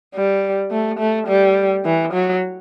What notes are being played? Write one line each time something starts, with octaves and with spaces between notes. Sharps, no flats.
G3
A3
A3
G3
E3
F#3